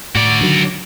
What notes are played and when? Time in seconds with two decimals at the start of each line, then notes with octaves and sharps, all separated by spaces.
0.15 A2 F#4 D5
0.41 D3 D#3 F#3